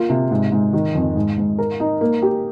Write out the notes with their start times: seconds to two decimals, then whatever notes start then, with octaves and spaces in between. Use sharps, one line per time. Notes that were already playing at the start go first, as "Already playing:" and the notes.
Already playing: A#3 F4
0.09 C3
0.31 G#2
0.52 G#2
0.73 D#3
0.95 F2
1.16 G#2
1.38 G#2
1.59 A#4
1.80 D#4
2.01 A#3
2.22 G4